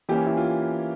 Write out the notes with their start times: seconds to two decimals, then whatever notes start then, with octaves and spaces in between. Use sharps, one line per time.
0.09 E3 A#3 C#4 G4
0.26 E4
0.37 F4